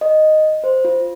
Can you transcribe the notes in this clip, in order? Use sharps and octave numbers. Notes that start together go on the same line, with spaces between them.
D#5
C5
F4